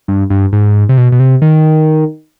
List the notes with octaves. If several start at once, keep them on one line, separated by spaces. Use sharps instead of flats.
G2
G2
G#2
C3
B2
B2
C3
D#3